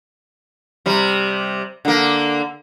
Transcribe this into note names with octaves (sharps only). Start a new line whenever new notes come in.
C3 G3
D3 A#3